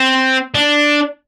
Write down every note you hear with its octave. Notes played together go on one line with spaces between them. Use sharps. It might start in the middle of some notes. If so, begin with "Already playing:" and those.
Already playing: C4
D4